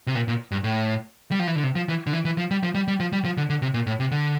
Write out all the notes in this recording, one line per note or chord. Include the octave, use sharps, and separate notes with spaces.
C3
A#2
A#2
G2
A2
G3
F3
E3
D3
C3
F3
E3
D3
E3
E3
F3
G3
F3
G3
G3
F3
G3
F3
D3
D3
C3
A#2
A2
C3
D3